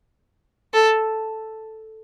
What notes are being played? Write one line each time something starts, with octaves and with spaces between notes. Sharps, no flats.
A4